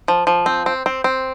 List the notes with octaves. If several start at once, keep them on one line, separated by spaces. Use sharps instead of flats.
F3
F3
C4
C4
C4
C4